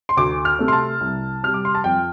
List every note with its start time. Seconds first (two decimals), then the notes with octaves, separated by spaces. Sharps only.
0.09 C6
0.17 D2 D6
0.45 F6
0.59 C3 A3
0.68 C6
0.73 A5
1.00 C2
1.43 C3 G3 F6
1.54 D6
1.65 C6
1.75 A5
1.84 F2 G5